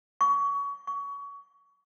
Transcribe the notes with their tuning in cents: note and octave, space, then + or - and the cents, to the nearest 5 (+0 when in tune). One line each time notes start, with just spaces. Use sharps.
C#6 +25
C#6 +25